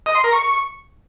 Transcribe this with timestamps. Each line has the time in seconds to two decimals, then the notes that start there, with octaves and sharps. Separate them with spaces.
0.06 D#5
0.15 C6
0.24 A#4
0.33 C#6